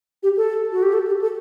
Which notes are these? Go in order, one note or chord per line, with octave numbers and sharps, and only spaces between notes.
G4
A4
F#4
G4
A4
G4
A4